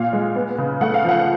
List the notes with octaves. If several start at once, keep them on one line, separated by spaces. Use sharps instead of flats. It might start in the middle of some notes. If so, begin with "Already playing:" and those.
Already playing: A#2 F5
G#3
B3
C#3
A3 F#5
F5
F3 F#5